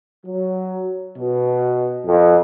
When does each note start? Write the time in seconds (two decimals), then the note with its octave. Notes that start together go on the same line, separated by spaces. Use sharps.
0.26 F#3
1.17 B2
2.06 F2